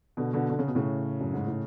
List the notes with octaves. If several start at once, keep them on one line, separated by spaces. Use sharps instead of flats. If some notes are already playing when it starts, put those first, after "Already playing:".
B2 D3
B2 D3
D3
C#3
B2
A2 C#3
F#2
G#2
A2